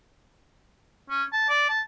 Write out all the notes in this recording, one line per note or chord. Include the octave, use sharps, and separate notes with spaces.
C#4
A5
D5
A5